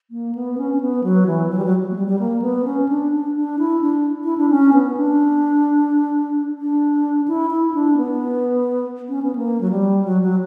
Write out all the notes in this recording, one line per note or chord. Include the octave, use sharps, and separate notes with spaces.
A#3
B3
C#4
C#4
B3
F#3
E3
F#3
G3
F#3
A#3
G3
G3
A#3
B3
C#4
D4
D4
D4
E4
D4
E4
D4
C#4
B3
D4
D4
E4
E4
D4
B3
C#4
B3
A#3
F#3
G3
F#3
F#3